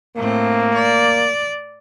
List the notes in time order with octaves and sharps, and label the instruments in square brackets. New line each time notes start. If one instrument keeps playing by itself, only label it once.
[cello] A2 C4 [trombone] A#3
[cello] D5